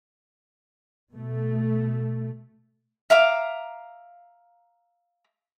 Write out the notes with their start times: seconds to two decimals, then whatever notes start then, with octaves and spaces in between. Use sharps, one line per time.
1.11 B2 A3
3.10 E5 F5 A#5 D6